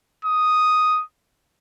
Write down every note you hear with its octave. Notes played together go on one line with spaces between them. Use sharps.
D#6